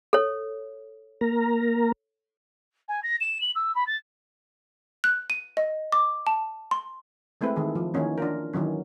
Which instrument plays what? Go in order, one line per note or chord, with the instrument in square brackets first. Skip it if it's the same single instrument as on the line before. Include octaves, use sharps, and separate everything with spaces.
[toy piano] A4 C#5
[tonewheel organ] A#3 A#4 A#5
[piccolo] G#5
A#6
E7
F#7
E6
B5
A6
[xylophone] F#6
D#7
D#5
D6
A5
C6
[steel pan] G#3 A3 C4 E4 B4
D#3 E3 G#4
F3
D#3 E3 A#3 C#4 D#4
D4 F4 A#4
D#3 E3 F#3 C#4